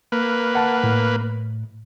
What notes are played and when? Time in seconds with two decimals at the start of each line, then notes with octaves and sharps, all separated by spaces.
0.12 A#3 B4
0.55 F#5 A5
0.83 A2